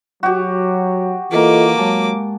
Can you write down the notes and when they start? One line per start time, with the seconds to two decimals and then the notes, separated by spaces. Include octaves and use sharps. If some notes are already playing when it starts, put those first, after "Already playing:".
0.23 F#3 F#4 G4
1.31 E3 A#3 F4 A4 D#5 D6
1.78 F#3 G#3 A5